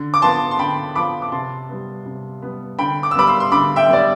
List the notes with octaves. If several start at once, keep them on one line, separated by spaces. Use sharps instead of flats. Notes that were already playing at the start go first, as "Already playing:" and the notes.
Already playing: D3
D6
F3 B3 A5 C6
C6
D3 G5 B5
F3 B3 B5 D6
D6
C3 A5 C6
G3 B3
C3
G3 B3
D3 G5 B5
D6
E6
G3 B3 B5 D6
C6 E6
C6
D3 B5 D6
E5 G5
G3 B3 D5